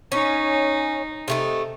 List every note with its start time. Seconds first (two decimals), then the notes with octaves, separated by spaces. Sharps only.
0.12 C#4 D#4
1.28 C3 A3 D#4